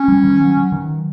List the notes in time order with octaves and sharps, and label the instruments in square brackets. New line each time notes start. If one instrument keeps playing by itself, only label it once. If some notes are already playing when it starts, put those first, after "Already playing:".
Already playing: [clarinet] C#4
[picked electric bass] G3
D#3
F#3
F#3
D#3